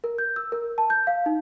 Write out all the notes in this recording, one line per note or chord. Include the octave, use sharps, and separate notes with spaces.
A#4
G6
E6
A#4
A5
G6
F5
D#4